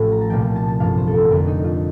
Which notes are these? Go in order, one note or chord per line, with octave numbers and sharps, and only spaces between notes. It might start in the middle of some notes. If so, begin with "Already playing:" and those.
Already playing: A1 A2 F3
A#5
A5
C2 A#2 F3 G5
A5
A5
A5
A1 G2 F3 F5
C5
A4
A#4
F1 F2 D3 A#4
D#4
F4